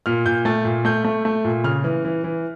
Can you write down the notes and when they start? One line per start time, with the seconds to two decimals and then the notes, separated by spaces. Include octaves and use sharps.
0.06 A#2 F6
0.26 A#2 G6
0.45 A3 A6
0.65 A#2
0.85 A3 G6
1.04 A3
1.25 A3
1.45 A#2
1.64 C#3 F6
1.84 E3
2.05 E3
2.24 E3